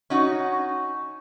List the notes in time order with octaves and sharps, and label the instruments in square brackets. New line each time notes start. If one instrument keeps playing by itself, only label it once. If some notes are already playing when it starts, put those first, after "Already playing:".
[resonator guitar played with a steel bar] C#4 D#4 F#4